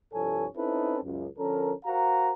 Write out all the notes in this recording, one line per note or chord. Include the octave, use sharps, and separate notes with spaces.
C2 G2 F3 A4 C#5 G#5
C4 C#4 D#4 E4 A4 B4
C#2 F#2
D3 F3 C#4 A4 A#4
F#4 A#4 C5 F5 A#5